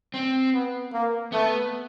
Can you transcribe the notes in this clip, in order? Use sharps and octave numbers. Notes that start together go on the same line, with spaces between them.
C4
B3
A#3
A3 B3